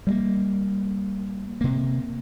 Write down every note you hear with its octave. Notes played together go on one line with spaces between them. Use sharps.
G3 G#3 A#3
C3 A#3